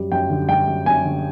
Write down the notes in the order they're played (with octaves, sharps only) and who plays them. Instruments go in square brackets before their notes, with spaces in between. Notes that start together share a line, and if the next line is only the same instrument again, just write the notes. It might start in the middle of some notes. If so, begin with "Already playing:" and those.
Already playing: [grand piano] F#2 G3
F#2 G5
D3
G3 G5
F#2
F#2 G#5
D3